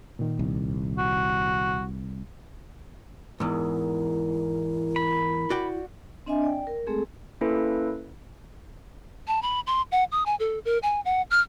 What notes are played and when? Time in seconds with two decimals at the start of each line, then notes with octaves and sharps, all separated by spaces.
0.19 A#2 D#3
0.39 C2
0.98 F#4
3.40 E2 G#2 E4 A#4
4.96 B5
5.50 F#4 D5 G5
6.26 C4 D4 D#5 E5 G#5
6.42 D5 G5
6.67 A#4
6.87 G#3 A3 C4 G#4 A4
7.41 A#3 C#4 E4 A4 B4
9.28 A5
9.42 B5
9.67 C6
9.92 F#5
10.12 D#6
10.26 G#5
10.40 A4
10.65 A#4
10.83 G#5
11.05 F#5
11.31 F6